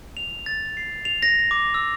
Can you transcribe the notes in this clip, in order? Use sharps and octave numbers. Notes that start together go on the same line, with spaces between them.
F7
A6
C7
F7
A#6
D6
E6